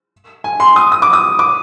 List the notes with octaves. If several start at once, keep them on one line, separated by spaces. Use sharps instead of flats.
G#5
C6
D#6
D#6
D6
D#6
D6